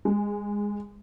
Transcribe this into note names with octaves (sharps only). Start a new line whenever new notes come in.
G#3